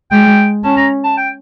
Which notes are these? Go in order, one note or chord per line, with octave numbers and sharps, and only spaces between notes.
G#3 G5
C#4 A5
A#5
A5
G5